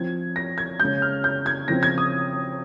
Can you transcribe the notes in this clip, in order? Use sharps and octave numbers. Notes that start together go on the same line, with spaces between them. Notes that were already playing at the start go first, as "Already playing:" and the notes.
Already playing: F3 C4 G#6
A#6
G#6
C#3 G#3 C#4 G6
F6
G6
G#6
C#3 F3 C4 A#6
G#6
D#6